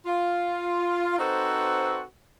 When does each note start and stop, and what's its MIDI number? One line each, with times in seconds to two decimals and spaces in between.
0.06 1.18 65
1.18 2.02 60
1.18 2.02 63
1.18 2.02 66
1.18 2.02 69
1.18 2.02 71
1.18 2.02 72